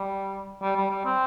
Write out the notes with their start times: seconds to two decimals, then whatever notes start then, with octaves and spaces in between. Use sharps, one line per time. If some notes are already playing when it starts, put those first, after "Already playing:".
Already playing: G3
0.62 G3
0.76 G3
0.91 G3
1.05 C4